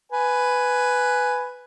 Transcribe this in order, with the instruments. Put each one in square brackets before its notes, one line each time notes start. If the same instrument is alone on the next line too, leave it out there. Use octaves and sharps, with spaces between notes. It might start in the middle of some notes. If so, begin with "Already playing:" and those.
[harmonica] B4 G#5